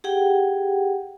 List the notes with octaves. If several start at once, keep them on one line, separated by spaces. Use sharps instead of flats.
G4 G#4 F#5 G5